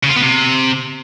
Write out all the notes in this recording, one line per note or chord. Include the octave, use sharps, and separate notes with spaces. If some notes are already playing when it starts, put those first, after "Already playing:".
C#3
F4
B3
C3